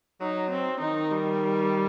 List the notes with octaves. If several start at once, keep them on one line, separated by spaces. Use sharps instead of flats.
F#3 D#4
C4
D#3 D#4
G3